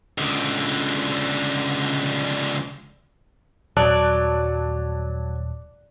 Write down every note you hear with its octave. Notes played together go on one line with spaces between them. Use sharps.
C#2 D3
D#1 F#3 D5 A5 F#6